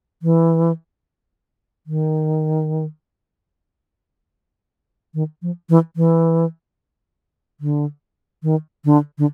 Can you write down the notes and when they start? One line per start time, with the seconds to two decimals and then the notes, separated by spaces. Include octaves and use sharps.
0.22 E3
1.87 D#3
5.14 D#3
5.42 F3
5.69 E3
5.96 E3
7.60 D3
8.43 D#3
8.85 D3
9.18 D3